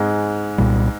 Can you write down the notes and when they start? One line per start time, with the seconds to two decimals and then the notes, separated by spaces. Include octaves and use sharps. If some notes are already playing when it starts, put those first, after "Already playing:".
Already playing: G#2 G#3
0.58 C2 A#2 G3